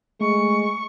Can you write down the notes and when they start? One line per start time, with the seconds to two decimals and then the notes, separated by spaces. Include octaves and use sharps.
0.21 G#3 A3 C#6